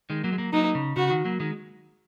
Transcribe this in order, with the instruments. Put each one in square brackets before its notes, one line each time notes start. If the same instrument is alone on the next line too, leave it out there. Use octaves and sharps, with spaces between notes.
[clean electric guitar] D#3 G#3
F#3 A#3
G#3
F#3 A#3
[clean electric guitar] F#3 A#3 [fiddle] D#4
[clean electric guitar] C#3
[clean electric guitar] C#3 [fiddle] F#4
[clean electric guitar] D#3
F#3 A#3
D#3 G#3